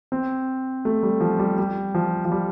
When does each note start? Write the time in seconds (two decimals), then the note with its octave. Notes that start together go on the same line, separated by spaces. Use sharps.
0.12 C4
0.85 A3
1.03 G3
1.21 F3
1.39 G3
1.58 G3
1.95 F3
2.25 F3
2.32 G3